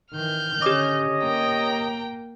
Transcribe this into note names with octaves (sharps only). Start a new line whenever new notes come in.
D#3 E3 F6 G6
D3 C#4 G4 C#5 D#5 D6
A#3 G5 A#5